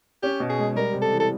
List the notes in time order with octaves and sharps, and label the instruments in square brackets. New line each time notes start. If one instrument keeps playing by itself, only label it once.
[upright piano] C#4 [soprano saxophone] G4
[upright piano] B2
[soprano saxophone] G#4
[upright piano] G#3
[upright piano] G3 [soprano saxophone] A#4
[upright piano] C3
[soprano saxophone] A4
[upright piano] E3
[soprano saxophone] A4